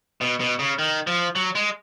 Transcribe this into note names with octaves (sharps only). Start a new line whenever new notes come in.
B2
B2
C#3
D#3
F3
F#3
G#3